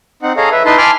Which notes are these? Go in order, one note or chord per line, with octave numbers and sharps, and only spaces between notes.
C4 D#4 F#5
G#4 A4 C#5 D#5 F5 A#5
B4 E5
D#4 E4 B4 A5 C6
G#5 A5 B5 C6 D6 F6